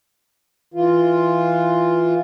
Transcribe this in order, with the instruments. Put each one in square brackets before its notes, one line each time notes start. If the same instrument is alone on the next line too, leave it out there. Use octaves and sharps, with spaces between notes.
[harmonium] E3 F4